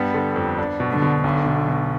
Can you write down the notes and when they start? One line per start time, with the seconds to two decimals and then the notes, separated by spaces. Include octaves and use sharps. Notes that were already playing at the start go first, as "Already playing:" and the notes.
Already playing: G2 G3 B3
0.14 D3
0.36 F2
0.58 D4
0.80 B2
0.91 D3
1.02 B2
1.24 B1 D3
1.46 B2
1.68 B2